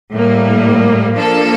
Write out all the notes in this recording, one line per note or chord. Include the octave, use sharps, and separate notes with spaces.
A2 G3 A#3
F3 A#3 D4 A4